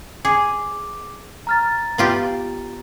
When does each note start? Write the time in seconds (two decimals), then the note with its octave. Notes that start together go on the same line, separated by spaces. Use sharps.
0.25 G#4 D6
1.47 A#5 F6 A6
1.98 B3 F4 G4